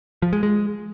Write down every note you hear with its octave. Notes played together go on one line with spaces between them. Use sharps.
F3
G#3
G#3